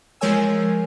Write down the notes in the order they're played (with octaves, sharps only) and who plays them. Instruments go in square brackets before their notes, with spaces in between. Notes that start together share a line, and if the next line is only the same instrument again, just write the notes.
[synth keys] F3 G#3 A#4 C#5 G#5 E6